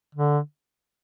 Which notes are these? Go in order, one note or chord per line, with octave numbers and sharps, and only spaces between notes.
D3